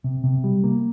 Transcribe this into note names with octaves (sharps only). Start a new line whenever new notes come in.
C3
C3
G3
A#3